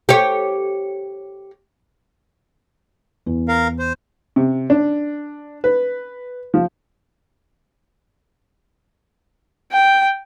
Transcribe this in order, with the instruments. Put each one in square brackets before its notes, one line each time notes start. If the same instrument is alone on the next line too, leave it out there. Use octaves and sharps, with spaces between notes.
[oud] G4 C#5
[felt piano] E2
[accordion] A#4 F5
C5
[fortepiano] C3
D4
B4
F3
[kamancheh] G5